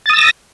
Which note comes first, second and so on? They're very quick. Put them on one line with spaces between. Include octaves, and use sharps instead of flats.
A6 D#6 E6 A#6